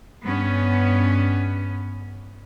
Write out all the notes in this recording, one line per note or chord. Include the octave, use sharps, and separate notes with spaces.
G2 B3 C#4